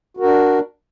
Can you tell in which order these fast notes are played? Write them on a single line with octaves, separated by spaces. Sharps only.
F#4 A#4 D4